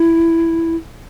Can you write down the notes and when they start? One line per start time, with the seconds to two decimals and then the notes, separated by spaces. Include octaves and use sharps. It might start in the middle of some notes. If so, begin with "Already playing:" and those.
Already playing: E4